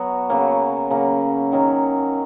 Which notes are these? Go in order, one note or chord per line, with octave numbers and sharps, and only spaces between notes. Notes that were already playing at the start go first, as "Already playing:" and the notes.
Already playing: F#3 B3 F#4
C#3 F#3 A#3
C#3 F#3 A#3
D#3 F#3 C#4